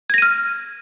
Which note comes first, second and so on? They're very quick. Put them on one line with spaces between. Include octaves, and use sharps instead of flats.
G#6 A#6 D#7 F6